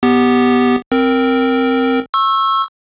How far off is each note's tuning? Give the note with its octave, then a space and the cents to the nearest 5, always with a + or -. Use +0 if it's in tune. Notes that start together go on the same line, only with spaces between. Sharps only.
B3 +0 G4 +0
C4 +0 A#4 +0
C#6 -30 E6 +0